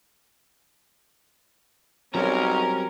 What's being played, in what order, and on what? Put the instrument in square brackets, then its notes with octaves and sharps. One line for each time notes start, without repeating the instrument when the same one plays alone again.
[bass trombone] B1 [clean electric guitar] F#3 G3 C4 [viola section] C#4 A#4 [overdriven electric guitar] A#5